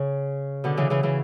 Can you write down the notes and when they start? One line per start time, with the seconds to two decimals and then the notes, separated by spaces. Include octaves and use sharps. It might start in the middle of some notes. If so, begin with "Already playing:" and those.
Already playing: C#3
0.64 B2 D3
0.77 C#3 E3
0.90 C#3 E3
1.03 C#3 E3